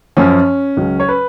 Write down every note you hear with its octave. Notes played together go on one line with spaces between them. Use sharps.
F#2 F3 C#4
C#2 C#3 F#3
C#5
B4